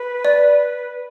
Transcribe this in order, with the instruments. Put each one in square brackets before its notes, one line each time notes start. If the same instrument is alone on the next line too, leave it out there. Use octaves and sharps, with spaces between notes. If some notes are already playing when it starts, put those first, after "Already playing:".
Already playing: [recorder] B4
[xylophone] D5